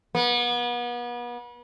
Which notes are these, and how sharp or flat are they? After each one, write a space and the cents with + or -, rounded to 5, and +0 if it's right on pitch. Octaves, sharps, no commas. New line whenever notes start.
B3 -35